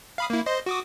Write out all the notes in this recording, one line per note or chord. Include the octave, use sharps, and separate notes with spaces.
F5 B5 D#6
A#3 E4
C5 D#5 C6
F#4 D6 D#6